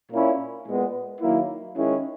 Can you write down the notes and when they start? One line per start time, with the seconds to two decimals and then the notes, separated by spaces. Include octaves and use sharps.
0.11 A#2 A#3 C#4 E4
0.66 A#2 G#3 B3
1.21 D#3 F#3 A#3 E4
1.77 D#3 G#3 C#4 E4